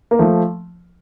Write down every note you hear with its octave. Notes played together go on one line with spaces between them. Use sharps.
A#3
F3 A3